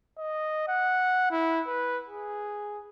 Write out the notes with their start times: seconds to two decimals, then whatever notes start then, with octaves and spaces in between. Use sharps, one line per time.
0.18 D#5
0.68 F#5
1.31 E4
1.67 B4
2.09 G#4